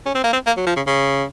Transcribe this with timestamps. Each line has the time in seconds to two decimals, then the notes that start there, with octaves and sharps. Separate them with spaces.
0.06 C#4
0.15 C4
0.24 A#3
0.33 C4
0.47 A#3
0.57 F#3
0.67 F3
0.76 C#3
0.87 C#3